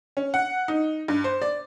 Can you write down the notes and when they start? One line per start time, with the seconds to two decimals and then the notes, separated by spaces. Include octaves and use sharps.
0.17 C#4
0.34 F#5
0.68 D#4
1.08 G2
1.24 C5
1.42 D5